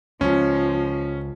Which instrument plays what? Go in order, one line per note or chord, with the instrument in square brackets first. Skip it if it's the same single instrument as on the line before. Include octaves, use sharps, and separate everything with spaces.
[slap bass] C#2 [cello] F3 [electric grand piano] C#4